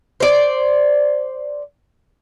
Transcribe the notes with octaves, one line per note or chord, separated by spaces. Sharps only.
C5 D5